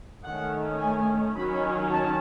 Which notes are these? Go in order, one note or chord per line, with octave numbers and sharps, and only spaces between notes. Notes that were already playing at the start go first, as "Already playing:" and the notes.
D#3 A3 C#4 F#5
G#5
D#3 F#3 C#4 B5
A5